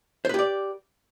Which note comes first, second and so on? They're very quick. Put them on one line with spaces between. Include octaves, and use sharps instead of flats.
C5 B4 G4 D5